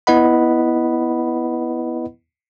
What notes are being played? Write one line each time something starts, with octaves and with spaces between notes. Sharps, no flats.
B3 E4 B4 D#5 F#5 B5